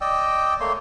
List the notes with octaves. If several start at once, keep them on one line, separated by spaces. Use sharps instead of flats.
D5 D#5 G5 E6
A3 A#3 C#5 C6